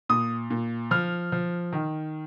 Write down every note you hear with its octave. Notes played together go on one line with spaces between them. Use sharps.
A#2 D#6
A#2
F3 F6
F3
D#3